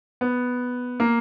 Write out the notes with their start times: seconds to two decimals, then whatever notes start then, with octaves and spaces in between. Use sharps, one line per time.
0.21 B3
1.00 A#3